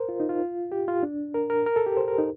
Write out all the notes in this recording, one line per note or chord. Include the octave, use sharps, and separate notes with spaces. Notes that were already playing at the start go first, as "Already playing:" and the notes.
Already playing: A#4 C5
F4
D#4
F4
G4
F4
D4
A#4
A#4
A#4
A4
G4
C5
A#4
D#4